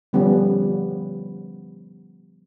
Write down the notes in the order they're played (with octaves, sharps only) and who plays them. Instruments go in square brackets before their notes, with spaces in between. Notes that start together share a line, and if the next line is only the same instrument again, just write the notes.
[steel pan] D3 F3 G3 B3 C#4